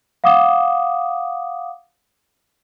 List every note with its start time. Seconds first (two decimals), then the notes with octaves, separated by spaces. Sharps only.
0.24 F5 F#5 D6 D#6